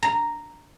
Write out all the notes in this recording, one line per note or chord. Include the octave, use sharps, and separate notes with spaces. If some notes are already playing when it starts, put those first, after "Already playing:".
A#5